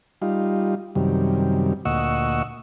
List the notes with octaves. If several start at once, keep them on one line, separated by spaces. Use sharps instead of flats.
G3 D#4 F4
F#2 C3 D#3 G3
D2 A#2 D#5 F#5 C#6 E6